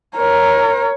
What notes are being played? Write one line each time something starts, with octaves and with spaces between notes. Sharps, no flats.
A#4 C#5